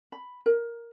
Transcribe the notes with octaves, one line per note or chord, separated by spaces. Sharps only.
B5
A#4